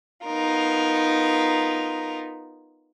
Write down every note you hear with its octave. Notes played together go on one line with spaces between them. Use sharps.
B3 D#4 F4 A#4